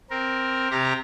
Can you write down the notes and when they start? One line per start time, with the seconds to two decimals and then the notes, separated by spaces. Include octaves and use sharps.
0.10 C4 A#4
0.71 C3 G4 A#5